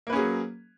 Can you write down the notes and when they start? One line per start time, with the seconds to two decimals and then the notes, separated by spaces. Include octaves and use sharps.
0.07 A#3
0.10 B4
0.13 C#4
0.16 G#4
0.19 F#3